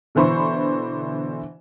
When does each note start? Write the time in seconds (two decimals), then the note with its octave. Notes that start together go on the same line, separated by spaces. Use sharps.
0.15 B2 D3 E3 C5 B5 C#6